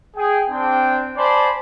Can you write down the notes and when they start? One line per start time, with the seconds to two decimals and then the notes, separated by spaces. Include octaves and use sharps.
0.16 G#4 G5
0.51 C4 D4 G5
1.17 C5 D5 G#5 A5 B5 C6